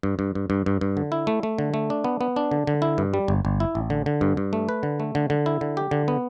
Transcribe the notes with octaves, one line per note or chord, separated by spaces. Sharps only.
G2
G2
G2
G2
G2
G2
D3
E4
A3
A3
D3
A3
D4
B3
B3
D4
D3
D3
E4
G2
G3
G1
G1
E4
A1
D3
D3
G2
G2
A3
B4
D3
A3
D3
D3
E4
D3
G4
D3
B3